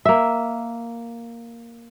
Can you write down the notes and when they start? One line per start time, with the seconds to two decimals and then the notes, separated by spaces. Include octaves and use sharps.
0.05 A#3 E5